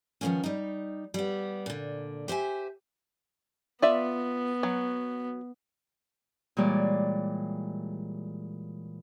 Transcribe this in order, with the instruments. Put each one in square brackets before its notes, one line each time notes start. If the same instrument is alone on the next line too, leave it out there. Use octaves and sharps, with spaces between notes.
[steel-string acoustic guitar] D#3 F3 G#3 A#3 B3 C#4
G3 D#4
G3 B3
A#2 D3
G4 C5 E5 G#5
[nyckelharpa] B3 [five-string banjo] F4 D5 E5
[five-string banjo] F#3
[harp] A#2 E3 G3 G#3 C#5 D5